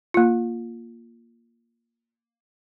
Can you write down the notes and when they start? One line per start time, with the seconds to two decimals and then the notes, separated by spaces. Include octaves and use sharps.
0.14 A#3 F4